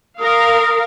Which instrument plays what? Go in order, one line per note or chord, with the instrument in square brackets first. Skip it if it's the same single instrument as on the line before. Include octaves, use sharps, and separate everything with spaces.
[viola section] A#4 F5 [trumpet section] D#6